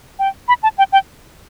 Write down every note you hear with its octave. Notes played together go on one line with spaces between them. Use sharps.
G5
B5
A5
G5
G5